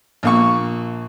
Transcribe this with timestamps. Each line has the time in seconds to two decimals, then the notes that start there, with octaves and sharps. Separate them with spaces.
0.23 A#1 A#3 C#6